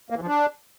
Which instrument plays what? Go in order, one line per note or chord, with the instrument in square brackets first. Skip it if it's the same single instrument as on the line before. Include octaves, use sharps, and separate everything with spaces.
[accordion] A#3
E3
F3
D4